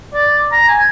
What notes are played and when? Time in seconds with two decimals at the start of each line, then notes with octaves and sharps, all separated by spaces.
0.14 D5
0.52 A#5
0.68 G#5